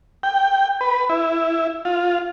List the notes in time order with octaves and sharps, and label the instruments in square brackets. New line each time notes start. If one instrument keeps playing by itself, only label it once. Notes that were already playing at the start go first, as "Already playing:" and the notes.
[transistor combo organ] G5
B4
E4
F4